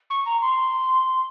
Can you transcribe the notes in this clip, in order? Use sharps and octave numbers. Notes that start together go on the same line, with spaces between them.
C#6
A#5
C6